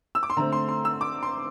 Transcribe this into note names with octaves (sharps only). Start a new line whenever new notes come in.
E6
D6
C6
D3 A3 C4 A#5
C6
C6
E6
D6
C6